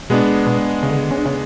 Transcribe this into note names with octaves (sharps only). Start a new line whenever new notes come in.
B2 G#3 B3 D4
B2
C#3
D3
C#3
D3
C#3
D3
C#3